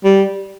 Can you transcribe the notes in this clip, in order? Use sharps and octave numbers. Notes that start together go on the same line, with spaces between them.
G3